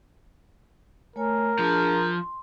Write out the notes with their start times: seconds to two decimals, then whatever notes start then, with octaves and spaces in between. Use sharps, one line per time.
1.16 A3 A#4 C#5 G#5
1.59 F3 D4 G#4 A5
1.93 C6